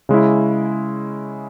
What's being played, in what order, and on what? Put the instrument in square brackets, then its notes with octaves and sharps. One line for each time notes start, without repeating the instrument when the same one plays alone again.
[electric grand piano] C#3 G#3 C#4 E4